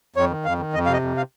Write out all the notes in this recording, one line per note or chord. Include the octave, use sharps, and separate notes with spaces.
F2 C#5
D#3
F2 F5
D#3
F2 D#5
C3 F5
D#5
F2
F5